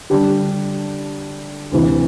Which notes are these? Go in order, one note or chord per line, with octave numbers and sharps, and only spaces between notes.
D3 G3 D4 G4
D2 C3 E3